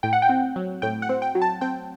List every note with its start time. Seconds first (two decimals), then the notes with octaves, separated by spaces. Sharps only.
0.03 A2 G5
0.13 F#5
0.22 G5
0.29 C4
0.56 F#3
0.82 A2 G5
1.02 F#5
1.09 C4
1.22 G5
1.35 F#3
1.42 A5
1.61 C4 G5